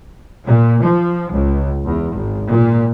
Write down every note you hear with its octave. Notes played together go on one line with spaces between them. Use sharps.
A#2
F3
C#2
E2
G#1
A#2